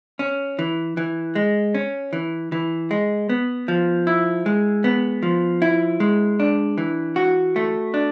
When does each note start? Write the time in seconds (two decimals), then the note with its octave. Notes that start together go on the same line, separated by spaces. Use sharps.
0.19 C#4
0.59 E3
0.97 E3
1.35 G#3
1.75 C#4
2.13 E3
2.52 E3
2.91 G#3
3.29 B3
3.68 F3
4.07 E4
4.46 G#3
4.84 B3
5.23 F3
5.62 E4
6.00 G#3
6.40 D4
6.78 E3
7.16 F#4
7.56 A3
7.94 D4